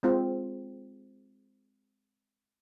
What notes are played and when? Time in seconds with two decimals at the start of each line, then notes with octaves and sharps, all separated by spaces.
0.03 G#3 C4 F4